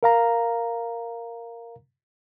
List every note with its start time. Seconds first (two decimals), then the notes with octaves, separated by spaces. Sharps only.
0.03 A#4 F5 A#5